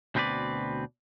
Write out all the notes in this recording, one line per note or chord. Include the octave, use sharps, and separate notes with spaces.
D2 B2 C4 D#4 B4 D5